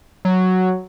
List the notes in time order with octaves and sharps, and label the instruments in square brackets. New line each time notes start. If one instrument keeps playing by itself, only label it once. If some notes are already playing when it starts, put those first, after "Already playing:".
[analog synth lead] F#3